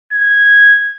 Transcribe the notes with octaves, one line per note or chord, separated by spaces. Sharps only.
G#6